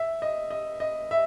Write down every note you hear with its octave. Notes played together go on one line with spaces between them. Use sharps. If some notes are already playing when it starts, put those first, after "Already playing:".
Already playing: E5
D#5
D#5
D#5
E5